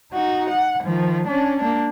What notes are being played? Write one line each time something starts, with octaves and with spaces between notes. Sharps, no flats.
D#4 F#4
F#5
D#3 F3
C#4 D4
A#3 D4